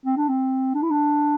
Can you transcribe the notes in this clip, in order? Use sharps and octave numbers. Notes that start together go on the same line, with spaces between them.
C4
D4
C4
D4
E4
D4